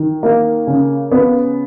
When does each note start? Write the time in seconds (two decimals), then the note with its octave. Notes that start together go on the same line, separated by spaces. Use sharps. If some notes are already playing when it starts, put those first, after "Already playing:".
Already playing: D#3
0.23 A#3
0.67 C#3
1.12 B3